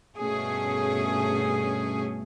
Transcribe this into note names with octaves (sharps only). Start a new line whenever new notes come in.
G2 B2 A3 C#4 G#4